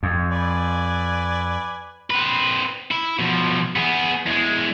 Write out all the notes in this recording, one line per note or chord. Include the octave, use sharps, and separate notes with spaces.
F2
B4 D5 G#5
C4 B4
E4
B2 F3
B3 G#4
E2 G#3